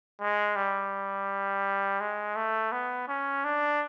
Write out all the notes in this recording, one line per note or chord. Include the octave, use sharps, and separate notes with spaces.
G#3
G3
G#3
A3
B3
C#4
D4